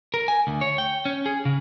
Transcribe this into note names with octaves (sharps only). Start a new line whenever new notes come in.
A#4
G#5
D2
C#5
G5
C#4
G#4
C#3